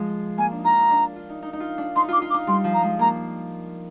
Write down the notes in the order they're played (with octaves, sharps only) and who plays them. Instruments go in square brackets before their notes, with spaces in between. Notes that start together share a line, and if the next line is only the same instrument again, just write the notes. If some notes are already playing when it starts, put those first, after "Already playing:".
Already playing: [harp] F3 G#3
[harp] A#3 [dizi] G#5
[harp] D4
D#4
[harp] F4 [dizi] A#5
[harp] D#4
D4
F4
D#4
D#4
D#4
F4
D4
[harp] D#4 [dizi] C6
[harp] F4 [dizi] D6
[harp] F4
[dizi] D6
[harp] D#4
[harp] G3 [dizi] C6
[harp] F3
[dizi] A#5
[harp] G#3
[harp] A#3 [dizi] A#5